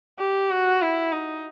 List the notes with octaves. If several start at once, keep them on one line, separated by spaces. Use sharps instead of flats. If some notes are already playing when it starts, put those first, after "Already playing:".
G4
F#4
E4
D#4